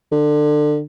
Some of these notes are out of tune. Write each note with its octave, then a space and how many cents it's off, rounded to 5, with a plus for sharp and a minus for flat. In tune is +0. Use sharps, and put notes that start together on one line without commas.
D3 +25